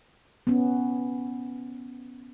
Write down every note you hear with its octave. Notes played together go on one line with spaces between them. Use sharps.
B3 C#4